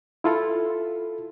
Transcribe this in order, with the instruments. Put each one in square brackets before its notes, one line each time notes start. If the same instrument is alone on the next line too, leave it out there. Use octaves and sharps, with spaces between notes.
[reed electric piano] E4 F4 A4